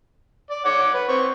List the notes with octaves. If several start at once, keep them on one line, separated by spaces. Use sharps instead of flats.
D5
C#5 F#5 D6
B4
C4 C#6